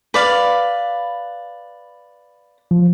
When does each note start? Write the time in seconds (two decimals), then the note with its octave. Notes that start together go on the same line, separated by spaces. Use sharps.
0.14 B4 D5 F5
2.71 F3